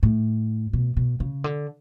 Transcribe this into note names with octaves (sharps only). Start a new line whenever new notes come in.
A2
B2
B2
C#3
D3